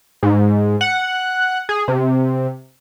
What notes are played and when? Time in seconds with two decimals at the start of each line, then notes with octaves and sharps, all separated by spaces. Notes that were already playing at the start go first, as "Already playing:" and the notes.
0.23 G#2
0.81 F#5
1.69 G#4
1.88 C3